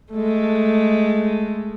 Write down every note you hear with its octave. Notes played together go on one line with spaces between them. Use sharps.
G#3 A3